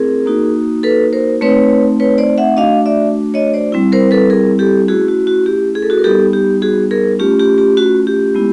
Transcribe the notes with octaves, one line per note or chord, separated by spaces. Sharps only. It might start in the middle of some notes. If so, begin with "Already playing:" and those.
Already playing: A3 C4 E4 G#4 A#4
A#3 D#4 F#4
A4 B4
A#4 C5
A3 C4 D#4 B4 C#5
B4 C#5
C5 D5
E5 F#5
A3 D4 F#4 D#5 F5
D5 E5
C#5 D#5
C5 D5
G3 C4 E4
A#4 C5
A4 B4
G#4 A#4
G4 A4
A3 C#4 E4 F#4 G#4
F#4
F#4
G4
G#4
A4
F#4 G#4
A#4
G3 B3 D#4 G4 A4
G4
F#4 G#4
G#4 A#4
A3 C#4 F4 G4
G4
G4
F#4
G4
G#3 B3 E4